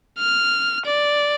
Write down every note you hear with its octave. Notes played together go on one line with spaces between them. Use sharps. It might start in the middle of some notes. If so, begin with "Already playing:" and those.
F6
D5